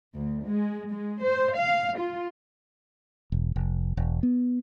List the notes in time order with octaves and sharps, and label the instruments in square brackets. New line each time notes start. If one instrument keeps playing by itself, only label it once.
[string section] D2
G#3
G#3
C5
F5
F4
[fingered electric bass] E1
F1
E1
B3